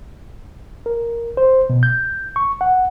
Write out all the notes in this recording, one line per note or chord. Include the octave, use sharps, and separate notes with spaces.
A#4
C5
B2
G6
C#6
F#5